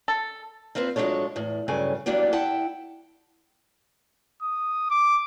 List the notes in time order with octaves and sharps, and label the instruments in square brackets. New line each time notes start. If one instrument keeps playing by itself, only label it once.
[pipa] A4
[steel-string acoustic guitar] A#3 C4 F4 B4 C5
F3 F#3 G#3 D4 A4 C#5
E2 A2
G2 C#3 F#3 A4 G#5
E3 F#3 G3 A#3 B3 D4
E4 F#5 G5 A5
[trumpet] D#6
D6